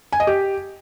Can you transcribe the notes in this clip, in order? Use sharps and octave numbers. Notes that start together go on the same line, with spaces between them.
G#5
D#5
G4